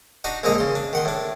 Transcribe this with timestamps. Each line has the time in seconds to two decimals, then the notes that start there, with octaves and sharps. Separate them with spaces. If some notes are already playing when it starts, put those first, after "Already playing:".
0.24 D4 D#4 F#4 D#5
0.43 A#1 A#2 D3 G#3 D#4 D#5
0.58 C#3 C6
0.75 D4
0.93 D#3 F#5 C6
1.05 A2 D4